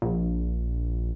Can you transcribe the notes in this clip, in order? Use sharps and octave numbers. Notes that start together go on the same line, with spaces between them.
A#1